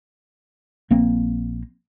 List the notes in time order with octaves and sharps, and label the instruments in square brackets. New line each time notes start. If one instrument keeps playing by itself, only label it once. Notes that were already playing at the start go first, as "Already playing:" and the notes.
[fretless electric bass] A#1 A#3 C4